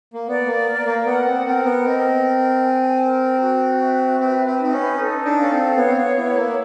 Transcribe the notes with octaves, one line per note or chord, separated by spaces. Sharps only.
A#3
B3 D5
A#3
A#4
A#3
B3 F#5
C4
C4 A#4
B3
C4 D#5
A#4
G#5
A#4
F#4
E5
C4 B4
C4
C4 D#4
C#4
A4
D4
C#4 F5
C4
B3 C#5
C4
B3
B3 E4
A#3